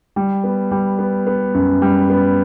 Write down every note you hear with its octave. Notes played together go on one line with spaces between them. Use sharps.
G3
B3
G3
B3
B3
F#2
G3
B3